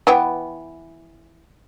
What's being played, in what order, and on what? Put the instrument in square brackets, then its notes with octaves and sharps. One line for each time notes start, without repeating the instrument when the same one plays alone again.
[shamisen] E3 B3 G5